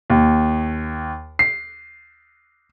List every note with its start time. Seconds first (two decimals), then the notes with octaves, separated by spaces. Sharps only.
0.10 D#2
1.39 C7